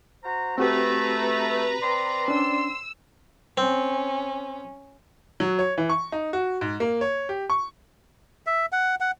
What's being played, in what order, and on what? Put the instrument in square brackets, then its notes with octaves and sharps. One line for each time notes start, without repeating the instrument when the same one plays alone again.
[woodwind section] F#4 C5 A#5
[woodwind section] A3 [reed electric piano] C4 F#4 G4 [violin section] B4 A#5
[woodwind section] C4 D5 C6
[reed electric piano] C#4 D4 [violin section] E6
[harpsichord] C4 [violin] C#4
[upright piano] F#3
C#5
E3
C#6
D#4
F#4
G#2
A#3
C#5
G4
C#6
[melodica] E5
F#5
F#5